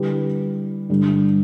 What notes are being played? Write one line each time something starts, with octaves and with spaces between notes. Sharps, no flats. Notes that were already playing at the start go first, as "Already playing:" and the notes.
Already playing: D3 G3 E4 G4 B4
G2 D3 G3 D4